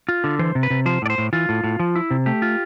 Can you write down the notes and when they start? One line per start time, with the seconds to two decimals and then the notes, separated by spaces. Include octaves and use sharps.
0.09 F4
0.24 D3
0.39 E3 C5
0.55 C3
0.63 B4
0.70 C3
0.86 F3 C5
1.02 A2 D5
1.10 C5
1.18 A2
1.33 E3 F4
1.49 A2
1.64 A2
1.80 F3
1.96 E4
2.11 C3
2.26 A3 G4
2.42 F4